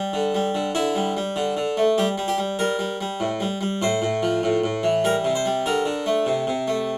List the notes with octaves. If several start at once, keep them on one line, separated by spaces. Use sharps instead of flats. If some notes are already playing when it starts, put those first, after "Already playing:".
Already playing: G3
D3
G3
D3
D3 E4
G3
G3
D3
D3
A3
G3 G4
G3
G4
G3
G3 A#4
G3
G3
A2
G3
G3
A2 C5
A2
F3
A2
A2
E3
G3 A#4
C3
C5
G3
D3 A#4
D3
A3
C3
C3
A3